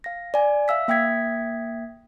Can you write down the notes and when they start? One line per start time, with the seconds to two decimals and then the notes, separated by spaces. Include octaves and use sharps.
0.04 F5 A#6
0.34 D5 G#5
0.68 E5 F5 E6 B6
0.88 A#3 E5 G5 D#6 G#6 B6